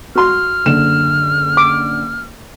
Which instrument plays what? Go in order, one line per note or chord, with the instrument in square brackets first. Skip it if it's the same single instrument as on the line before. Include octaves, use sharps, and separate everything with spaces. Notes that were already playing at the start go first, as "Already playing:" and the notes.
[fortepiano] F#4 C6 [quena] F6
[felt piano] F#1 D3 E7
[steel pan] D6